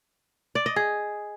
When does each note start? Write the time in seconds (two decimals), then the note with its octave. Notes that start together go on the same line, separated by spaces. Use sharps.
0.55 D5
0.66 D#5
0.76 G#4